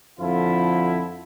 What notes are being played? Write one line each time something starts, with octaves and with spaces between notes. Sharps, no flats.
F2 D3 F3 E4 F4